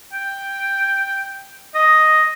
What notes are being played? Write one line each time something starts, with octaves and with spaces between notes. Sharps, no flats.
G5
D#5